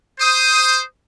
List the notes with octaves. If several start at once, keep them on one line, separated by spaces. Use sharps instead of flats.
C5 D#6